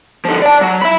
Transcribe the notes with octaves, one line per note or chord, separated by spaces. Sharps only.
D3 F3
D5 A5
F#3
E5 B5